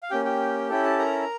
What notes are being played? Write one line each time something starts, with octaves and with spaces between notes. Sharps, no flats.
F5
A#3 C#4 G4 G5
G4 G5
C#4 E4 A4 G5
A5
A#4 A#5